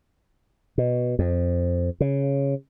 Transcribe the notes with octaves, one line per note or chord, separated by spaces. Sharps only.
B2
F2
C#3